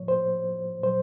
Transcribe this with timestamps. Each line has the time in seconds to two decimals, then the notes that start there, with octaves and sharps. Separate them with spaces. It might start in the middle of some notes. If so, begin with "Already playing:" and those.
Already playing: A2 F3 C#5
0.08 C5
0.83 A#2 F#3 C5